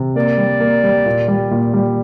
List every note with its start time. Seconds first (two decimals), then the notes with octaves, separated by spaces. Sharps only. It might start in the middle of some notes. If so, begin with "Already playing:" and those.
Already playing: C3
0.16 A#3 D5
0.38 G3
0.60 A#3
0.84 G3
1.06 A#2
1.28 G3
1.51 A#2
1.74 G3